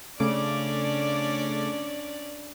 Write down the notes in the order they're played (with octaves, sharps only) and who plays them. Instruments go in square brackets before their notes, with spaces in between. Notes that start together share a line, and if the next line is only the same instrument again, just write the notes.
[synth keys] C#3 A3 D6 [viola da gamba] C#4 D4 D5